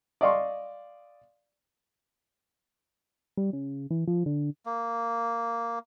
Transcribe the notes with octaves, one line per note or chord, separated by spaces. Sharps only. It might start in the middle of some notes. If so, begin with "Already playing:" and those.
D5 D#5 F5 C6 C#6
G3
C#3
E3
F3
D3
A#3